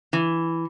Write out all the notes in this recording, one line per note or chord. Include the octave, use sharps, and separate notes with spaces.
E3